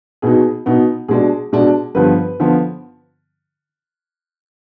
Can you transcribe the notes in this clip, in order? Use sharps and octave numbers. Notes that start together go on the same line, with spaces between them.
B2 B3 D#4 G#4
B2 B3 D#4
B2 G#3 D4 G#4
B2 G#3 D4
G2 D3 F3 B3 B4
D3 F3 B3